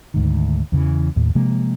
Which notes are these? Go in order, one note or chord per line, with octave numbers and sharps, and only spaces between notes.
D2 G#2 D#3
E2 C#3 E3
D#2 A2
C3 F3 G#3 A#3